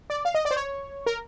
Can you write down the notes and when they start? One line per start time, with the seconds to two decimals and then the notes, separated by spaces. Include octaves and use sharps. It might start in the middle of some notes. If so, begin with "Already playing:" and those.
0.10 D5
0.25 F5
0.35 D#5
0.45 D5
0.51 C5
0.56 C#5
1.06 A#4